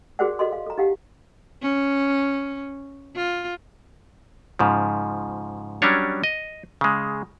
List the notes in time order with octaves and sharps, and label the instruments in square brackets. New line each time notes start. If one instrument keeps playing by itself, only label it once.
[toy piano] F#4 G#4 A#4 C5 D5 F#5
F#4 A4 D#5 C6
F5
A4 A#5
D#4 G4 F5 F#5
[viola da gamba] C#4
F4
[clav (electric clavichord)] G#2 C#3 F3
F#3 G3 C#4 D4 C#5
D#5
C#3 G#3